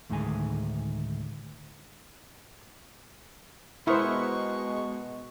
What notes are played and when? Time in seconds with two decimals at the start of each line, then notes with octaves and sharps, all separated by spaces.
0.10 D2 A2 D#3 G#3 G#5
3.87 B2 G#3 B3 E4 A#4 C5 C#6